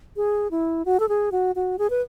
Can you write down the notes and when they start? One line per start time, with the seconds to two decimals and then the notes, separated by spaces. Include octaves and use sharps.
0.16 G#4
0.51 E4
0.85 F#4
1.00 A4
1.09 G#4
1.32 F#4
1.56 F#4
1.79 G#4
1.90 B4